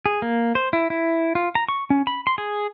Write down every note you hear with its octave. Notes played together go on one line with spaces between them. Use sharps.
G#4
A#3
C5
E4
E4
F4
A#5
C#6
C#4
B5
C6
G#4